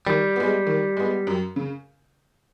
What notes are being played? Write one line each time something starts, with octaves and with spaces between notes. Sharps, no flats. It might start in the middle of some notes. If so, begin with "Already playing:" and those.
D#3 G3
G#3 B3
D#3
G#3 B3
F#2
C#3